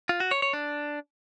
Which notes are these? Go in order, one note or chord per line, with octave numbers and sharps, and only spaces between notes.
F4
F#4
C#5
C#5
D4